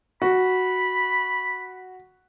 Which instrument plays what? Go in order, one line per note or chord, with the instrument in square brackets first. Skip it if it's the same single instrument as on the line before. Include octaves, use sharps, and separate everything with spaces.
[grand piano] F#4 [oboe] B5